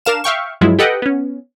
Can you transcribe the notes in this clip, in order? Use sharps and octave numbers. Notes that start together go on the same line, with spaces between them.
D4 A#4 F5 E7
E5 F5 G5 C#6
G2 F3 F#3 G#3 E4 F4
G4 A4 B4 D#5 F#5 G5
B3 C#4